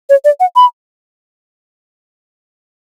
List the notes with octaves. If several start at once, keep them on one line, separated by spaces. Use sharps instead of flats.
C#5
D5
F#5
B5